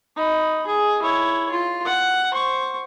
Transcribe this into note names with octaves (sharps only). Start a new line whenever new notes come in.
D#4 B5
G#4
E4 C#5
F4
F#5
C5 C#6